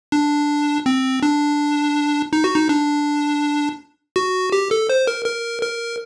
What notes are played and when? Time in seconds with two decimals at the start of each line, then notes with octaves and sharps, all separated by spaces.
0.12 D4
0.86 C4
1.23 D4
2.33 D#4
2.44 F#4
2.55 D#4
2.69 D4
4.16 F#4
4.52 G4
4.71 A4
4.89 C5
5.07 A#4
5.26 A#4
5.63 A#4